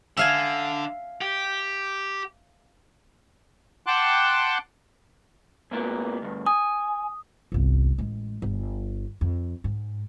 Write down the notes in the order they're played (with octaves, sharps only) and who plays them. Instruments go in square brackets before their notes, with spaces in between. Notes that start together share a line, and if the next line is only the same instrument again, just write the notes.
[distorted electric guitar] D3 [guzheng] E5 F5 G#5
[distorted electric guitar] G4
[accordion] F#5 G5 A5 C6 D6 F#6
[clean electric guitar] G#2 A#3 B3
D2 G2
[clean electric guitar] G#5 [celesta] D#6
[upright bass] G1 C2
A1 G#3
G1
F2
G#2